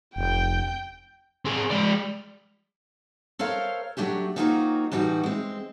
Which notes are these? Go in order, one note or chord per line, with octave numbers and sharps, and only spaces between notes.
F1 G5 G6
C4 G#4
G#3 D5
A4 A#4 C5 C#5 F5
F#3 A3 D4 F#4 G4
F#3 A#3 C4 D#4 F4 F#4
A2 E3 G3 D#4 F#4
G#3 C4